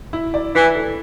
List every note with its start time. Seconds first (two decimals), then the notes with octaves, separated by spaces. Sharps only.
0.13 E4
0.34 D5
0.54 E3 E4
0.75 A4